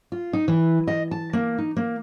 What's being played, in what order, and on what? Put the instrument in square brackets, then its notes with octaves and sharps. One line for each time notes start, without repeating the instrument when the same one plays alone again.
[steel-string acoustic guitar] F4
D#4
E3
D#5
A5
A#3
D#4
A#3